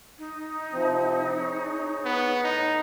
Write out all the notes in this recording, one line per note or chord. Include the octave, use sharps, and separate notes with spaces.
D#4
C3 F3 C4
G#4 C#5
B3
A2 D#4